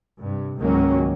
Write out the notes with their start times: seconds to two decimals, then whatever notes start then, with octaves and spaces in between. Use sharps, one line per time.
0.21 G2 C3
0.59 C#2 G#2 D#3 F#3 A#3 C#4